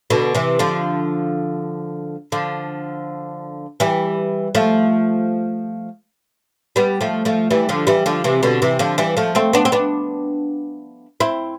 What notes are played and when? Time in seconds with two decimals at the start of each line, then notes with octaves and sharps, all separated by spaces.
0.10 B2 D3
0.35 C3 E3
0.59 D3 F3
2.32 D3 F3
3.80 E3 G3
4.55 F3 A3
6.76 G3 B3
7.01 F3 A3
7.25 F3 A3
7.51 E3 G3
7.69 D3 F3
7.87 E3 G3
8.06 D3 F3
8.24 C3 E3
8.43 B2 D3
8.62 C3 E3
8.79 D3 F3
8.98 E3 G3
9.17 F3 A3
9.35 A3 C4
9.53 B3 D4
9.65 C4
9.72 B3 D4
11.20 C4 E4